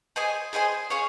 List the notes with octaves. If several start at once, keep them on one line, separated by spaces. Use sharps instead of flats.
G#4 C5 D#5 G#5
G#4 C5 D#5 G#5
C#4 G#4 C#5 F5